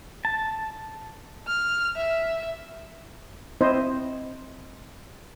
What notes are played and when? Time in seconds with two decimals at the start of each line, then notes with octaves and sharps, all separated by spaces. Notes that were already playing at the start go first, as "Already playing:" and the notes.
0.25 A5
1.47 F6
1.96 E5
3.61 C4 E4 C5 D#5